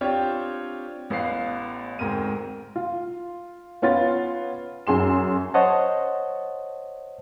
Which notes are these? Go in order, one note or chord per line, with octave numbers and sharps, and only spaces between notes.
C4 D4 F4 G4 C#5
A1 B3 F5 C7
D2 G#2 C4 A#4 D#7
F4
B3 C#4 F4 C6 A6
F#2 G#4 C6 E7
C5 C#5 D#5 F#5 A5